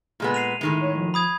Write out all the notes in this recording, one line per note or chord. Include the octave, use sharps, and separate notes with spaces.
A#2 G#3 B3
C7 D#7 F7
A2 D#3 G#3
C#5
F3
B5 D#6 G#6